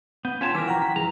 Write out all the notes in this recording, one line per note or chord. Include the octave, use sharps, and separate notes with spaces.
B3 G6
C#4 F4 C#5 G5 A5 C6 B6
E3 A4 A#4 G#5 D6 B6
F3 F#3 F#4 F#5 G5 A#5
B6
F#2 E3 G#4 A#5